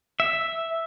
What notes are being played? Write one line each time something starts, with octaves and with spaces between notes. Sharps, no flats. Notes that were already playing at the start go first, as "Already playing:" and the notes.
E5